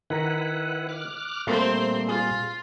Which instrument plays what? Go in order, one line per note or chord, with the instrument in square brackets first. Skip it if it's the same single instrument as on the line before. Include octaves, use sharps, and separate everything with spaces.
[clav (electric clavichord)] D#3 A#5 [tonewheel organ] E4 B4 F#5
[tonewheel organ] D6 F6 F#6
[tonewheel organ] A#2 G3 [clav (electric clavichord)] A3 A#3 [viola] C4 C5
[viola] F4 [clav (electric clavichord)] G#4